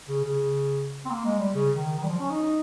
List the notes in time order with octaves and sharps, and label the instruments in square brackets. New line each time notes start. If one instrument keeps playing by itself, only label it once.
[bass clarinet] C#3
C#3
C4
A#3
G#3
G3
C#3
D#3
D#3
G3
F3
C#4
D#4
D#4